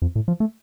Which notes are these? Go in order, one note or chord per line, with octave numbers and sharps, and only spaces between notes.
F2
A2
F3
A3